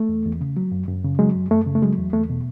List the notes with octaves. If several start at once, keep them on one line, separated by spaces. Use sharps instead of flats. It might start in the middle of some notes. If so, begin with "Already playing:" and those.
Already playing: A3
E2
E2
C#3
F#3
F#2
F#2
C#3
F#3 G#3
F#2
F#2 A3
C#3
A3
F#3 G#3
E2
E2 A3
B2